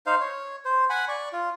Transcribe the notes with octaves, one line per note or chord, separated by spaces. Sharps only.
D#4 C5 F5
C#5
C5
F#5 G#5 B5
D5 C#6
F4